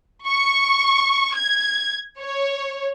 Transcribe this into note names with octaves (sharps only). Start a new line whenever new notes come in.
C#6
G#6
C#5